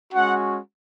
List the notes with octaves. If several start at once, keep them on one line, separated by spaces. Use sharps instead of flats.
G#3 C#4 F#4 F#5